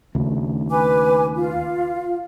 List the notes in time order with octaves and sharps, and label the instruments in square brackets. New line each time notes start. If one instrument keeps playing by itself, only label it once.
[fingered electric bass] D#2 C#3 A3
[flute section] B4 G#5 D6
F4